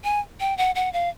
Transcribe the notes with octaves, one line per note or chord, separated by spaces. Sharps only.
G#5
G5
F#5
F#5
F5